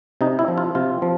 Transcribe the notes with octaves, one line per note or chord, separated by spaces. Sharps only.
C3 D#4
E4
F3
F4
C3 F4
F3